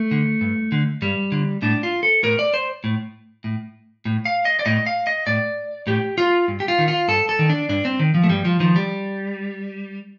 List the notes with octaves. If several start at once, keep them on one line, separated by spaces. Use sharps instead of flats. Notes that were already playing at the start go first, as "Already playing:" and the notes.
Already playing: A3
D3
G2
D3
G2 G3
D3
A2 D4
F4
A4
A2 A#4
D5
C5
A2
A2
A2
F5
D#5
D5
A2 D#5
F5
D#5
A2 D5
A2 G4
F4
G2
G4
F4
D#3
F4
G2 A4
A4
D#3
D4
G2 D4
C4
D#3
F3
A3
G2 G3
F3
D#3 F3
G3